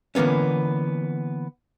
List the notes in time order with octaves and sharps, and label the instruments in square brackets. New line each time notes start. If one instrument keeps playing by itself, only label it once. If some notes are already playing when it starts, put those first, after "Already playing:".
[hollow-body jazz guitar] D3 E3 A#3 B3 C#4